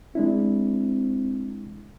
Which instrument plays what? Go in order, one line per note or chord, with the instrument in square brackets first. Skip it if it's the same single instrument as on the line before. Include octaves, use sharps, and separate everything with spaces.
[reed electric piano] G#3 D4 E4 [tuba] C4